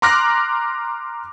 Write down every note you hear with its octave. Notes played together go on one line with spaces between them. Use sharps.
A#5 C6 D6 F6 F#6 A#6